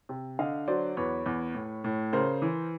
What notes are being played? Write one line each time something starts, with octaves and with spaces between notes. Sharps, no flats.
C3
D3 D#5 F5
F#3 C5 D5
E2 B4 C#5
E2
A2
A2
C#3 A#4 C5
E3